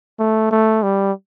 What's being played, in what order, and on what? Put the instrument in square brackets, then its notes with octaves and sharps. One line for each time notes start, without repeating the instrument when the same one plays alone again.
[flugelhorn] A3
A3
G3